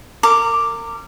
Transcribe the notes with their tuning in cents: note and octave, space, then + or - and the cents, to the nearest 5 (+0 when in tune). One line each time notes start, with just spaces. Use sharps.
A#4 -30 D6 +0